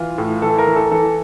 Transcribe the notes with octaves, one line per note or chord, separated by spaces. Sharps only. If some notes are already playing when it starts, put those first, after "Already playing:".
Already playing: E3 F4
A2
E3 A4
A#4
E3
A4
E3 A4